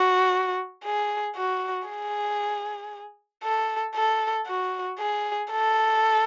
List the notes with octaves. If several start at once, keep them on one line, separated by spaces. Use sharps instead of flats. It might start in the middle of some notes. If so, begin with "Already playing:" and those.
Already playing: F#4
G#4
F#4
G#4
A4
A4
F#4
G#4
A4